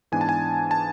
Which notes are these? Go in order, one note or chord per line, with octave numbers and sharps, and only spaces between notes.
G#2 E3 B3 D4 G#5
A5
G#5
A5